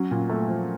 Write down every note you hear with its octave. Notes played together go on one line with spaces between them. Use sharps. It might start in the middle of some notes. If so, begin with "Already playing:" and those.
Already playing: F#3 C#4
A#2
A3
F3